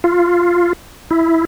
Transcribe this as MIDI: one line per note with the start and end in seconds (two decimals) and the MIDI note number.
0.04 0.73 65
1.11 1.45 64